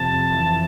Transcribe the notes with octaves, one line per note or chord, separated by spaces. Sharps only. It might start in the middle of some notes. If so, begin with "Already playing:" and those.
Already playing: F2 C3 A5
E3